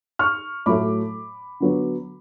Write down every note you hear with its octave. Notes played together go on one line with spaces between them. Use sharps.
C#6 F6
A2 F#3 A3 B5 D6
D3 F#3 B3